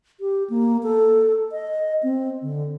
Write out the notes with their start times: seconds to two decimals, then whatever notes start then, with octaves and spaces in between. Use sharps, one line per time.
0.20 G4
0.50 A#3
0.83 A4
1.52 D#5
2.03 C4
2.42 D3